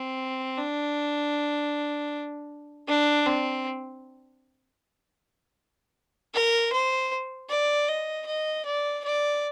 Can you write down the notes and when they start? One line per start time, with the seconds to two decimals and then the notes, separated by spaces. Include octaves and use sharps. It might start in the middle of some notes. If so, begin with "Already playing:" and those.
Already playing: C4
0.58 D4
2.88 D4
3.26 C4
6.34 A#4
6.73 C5
7.50 D5
7.88 D#5
8.26 D#5
8.66 D5
9.04 D5